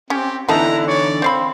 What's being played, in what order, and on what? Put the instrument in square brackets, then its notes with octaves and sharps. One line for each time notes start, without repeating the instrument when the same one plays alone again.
[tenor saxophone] C4 [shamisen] C#4 [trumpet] G4
[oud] D3 E3 D#4 [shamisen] B3 C#4 A5 [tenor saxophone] E4 [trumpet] A#5
[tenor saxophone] C#5 [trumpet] D5
[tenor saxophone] C4 [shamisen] C5 F5 B5